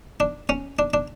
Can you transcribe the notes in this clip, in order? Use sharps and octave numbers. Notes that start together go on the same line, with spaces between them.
D4
C#4
D4
D4